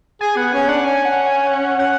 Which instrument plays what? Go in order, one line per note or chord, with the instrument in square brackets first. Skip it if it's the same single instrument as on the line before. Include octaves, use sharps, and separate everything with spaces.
[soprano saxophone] G#4 [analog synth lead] G#5
[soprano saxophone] B3 [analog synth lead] F#5
[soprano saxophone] C#4 [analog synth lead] G#5
[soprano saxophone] D4 [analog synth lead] F#5
[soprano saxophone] C#4 [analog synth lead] G#5
[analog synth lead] F#5
G#5
F#5
F#5